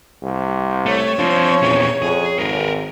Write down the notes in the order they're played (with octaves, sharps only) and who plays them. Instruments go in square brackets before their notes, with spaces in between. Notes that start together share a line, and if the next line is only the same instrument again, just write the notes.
[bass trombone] C2
[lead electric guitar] A3 [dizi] C#5
[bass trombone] F3 [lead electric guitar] C4 D4
[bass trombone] E2 [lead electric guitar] A#2 C#4
[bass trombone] F2 [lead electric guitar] G#4
[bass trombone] G#1 [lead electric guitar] A#4 B4